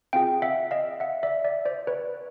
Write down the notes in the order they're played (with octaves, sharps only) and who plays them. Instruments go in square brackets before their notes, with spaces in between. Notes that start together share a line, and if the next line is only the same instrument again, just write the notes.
[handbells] C4 F4 G#4 F5 G5
E5 F#5
D#5 F5
E5 F#5
D5 E5
D5 E5
C5 D5
B4 C#5